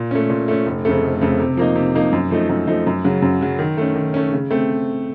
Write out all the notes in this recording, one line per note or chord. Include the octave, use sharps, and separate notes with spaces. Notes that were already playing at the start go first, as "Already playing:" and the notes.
Already playing: A#2
A3 C#4
A#2
A3 C#4
F1
F2 C#3 A3
F1
F2 C#3 A3
C3
F3 A#3 D#4
C3
F3 A#3 D#4
F#2
F3 A3 D#4
F#2
F3 A3 D#4
F#2
C#3 F#3
F#2
C#3 F#3
D#3
A3 C#4
D#3
A3 C#4
C#3
A3 C4